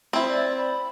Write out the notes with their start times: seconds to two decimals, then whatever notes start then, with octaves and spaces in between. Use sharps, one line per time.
0.13 C4 E4
0.28 D5
0.58 B5